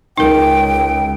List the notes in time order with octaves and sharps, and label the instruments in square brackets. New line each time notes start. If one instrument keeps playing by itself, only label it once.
[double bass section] C#2 [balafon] D#4 A#4 [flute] G5